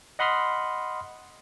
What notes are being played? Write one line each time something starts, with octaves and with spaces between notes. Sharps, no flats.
D#5 F#5 B5 C6 D#6 F6